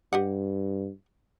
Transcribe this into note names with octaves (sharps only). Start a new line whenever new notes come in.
G2 G4 D#5 F#5